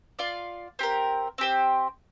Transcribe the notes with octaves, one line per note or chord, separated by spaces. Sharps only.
F4 D5 F5
C4 G4 A#4
C4 G4 C5